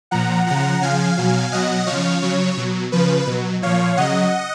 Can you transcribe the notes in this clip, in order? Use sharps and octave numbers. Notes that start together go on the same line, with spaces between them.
A#2 F3 F#5 A#5
C#3 F3 F#5 A#5
C#3 F3 F5 G#5
B2 F#3
B2 F#3 D#5 F#5
C#3 F3 C#5 F5
C#3 F#3 C#5
B2 F#3
C#3 F3 B4
B2 F#3
A#2 F3 C#5 F5
C#3 F#3 D#5 F#5